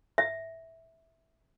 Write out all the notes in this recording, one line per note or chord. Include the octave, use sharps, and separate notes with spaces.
E5